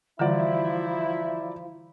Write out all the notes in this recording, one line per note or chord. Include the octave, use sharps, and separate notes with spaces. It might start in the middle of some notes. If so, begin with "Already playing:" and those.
D3 E3 F3 G3 E4 F#4 D5 A#5